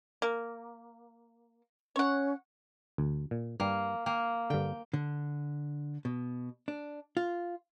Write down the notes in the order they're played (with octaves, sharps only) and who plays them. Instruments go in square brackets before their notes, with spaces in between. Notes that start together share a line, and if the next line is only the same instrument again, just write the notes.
[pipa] A#3
[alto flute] C#4 [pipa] C#5 F#5
[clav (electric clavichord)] D2
A#2
[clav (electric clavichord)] G2 G3 [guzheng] A#3
[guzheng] A#3 [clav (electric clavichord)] G5
[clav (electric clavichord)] G2 D3 [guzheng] G5
[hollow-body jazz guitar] D3
B2
D4
F4